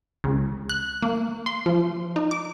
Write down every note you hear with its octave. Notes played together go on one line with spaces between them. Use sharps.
C#2
F#6
A#3
C6
F3
D#4
D6